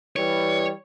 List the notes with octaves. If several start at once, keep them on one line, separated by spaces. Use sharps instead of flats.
E3 G3 C#5